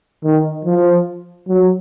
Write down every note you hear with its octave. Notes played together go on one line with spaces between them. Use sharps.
D#3
F3
F#3